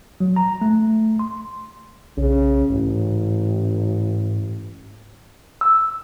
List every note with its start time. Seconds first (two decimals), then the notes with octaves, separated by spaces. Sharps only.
0.20 F#3
0.36 A#5
0.62 A3
1.19 C6
2.17 B1 C#3
2.70 A1 G#2
5.61 E6